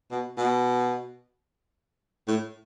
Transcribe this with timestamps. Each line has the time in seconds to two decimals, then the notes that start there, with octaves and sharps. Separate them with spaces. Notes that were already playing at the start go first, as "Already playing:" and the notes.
0.11 B2
0.37 B2
2.28 A2